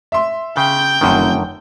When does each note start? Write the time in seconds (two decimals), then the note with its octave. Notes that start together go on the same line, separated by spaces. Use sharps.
0.12 E5 C6
0.57 C#3 G5 G6
1.01 F1 F#2 D3 D#3